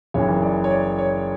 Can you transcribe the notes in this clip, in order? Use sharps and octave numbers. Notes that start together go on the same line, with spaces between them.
F#1 F#2 E3 C#5
D5
C#5
D5
C#5